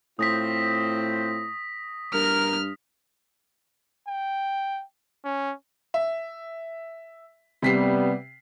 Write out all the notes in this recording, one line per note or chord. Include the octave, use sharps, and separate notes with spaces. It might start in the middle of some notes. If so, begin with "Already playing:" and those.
A2 C4 F4 C5 D#6 A#6 B6
G2 A#4 F6
G5
C#4
E5
C3 G3 B3 B6 C7